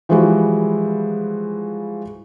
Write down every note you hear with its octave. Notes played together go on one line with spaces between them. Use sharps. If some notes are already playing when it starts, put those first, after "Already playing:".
E3 F3 G3 G#3 E4 F#4